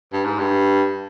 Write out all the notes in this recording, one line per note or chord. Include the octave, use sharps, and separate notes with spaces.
G2
G#2
G2